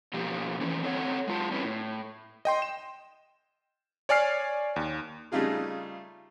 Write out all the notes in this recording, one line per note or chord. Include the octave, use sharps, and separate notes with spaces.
B2 F3 A#3 G4
D3 E3 F3 A3 C#4
C4 A4 C#5 F#5
G#3 F4 A5
G3 C4 C#4 E4 B4
A2
D#5 G5 C6
E7
C#5 D5 G#5 F6 C7
D#2
C#3 G3 A3 D#4 F4 G#4